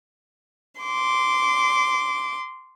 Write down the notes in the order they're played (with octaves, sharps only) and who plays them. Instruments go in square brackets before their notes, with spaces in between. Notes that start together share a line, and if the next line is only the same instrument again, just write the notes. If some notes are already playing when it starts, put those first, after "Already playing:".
[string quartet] C6 D6